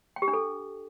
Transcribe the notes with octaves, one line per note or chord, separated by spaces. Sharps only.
G5
G4
D4
A4